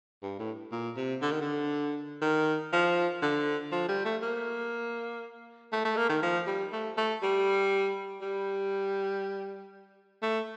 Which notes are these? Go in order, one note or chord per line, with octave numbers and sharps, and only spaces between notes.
G2
A2
A#2
C3
D3
D#3
D3
D#3
F3
D3
F3
G3
A3
A#3
A3
A3
A#3
D#3
F3
G3
A3
A3
G3
G3
A3